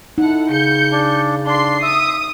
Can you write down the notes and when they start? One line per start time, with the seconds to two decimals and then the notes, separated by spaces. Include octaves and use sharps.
0.18 D#4 E4 A4 F#5
0.50 C#3 G6 C#7
0.92 D4
1.46 D4 C6 C7
1.83 E5 D#6